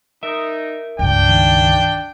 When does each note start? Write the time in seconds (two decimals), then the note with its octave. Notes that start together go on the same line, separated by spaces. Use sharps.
0.23 D#4 A#4 E5
0.99 C#2 G2 D4 G5
1.29 D#3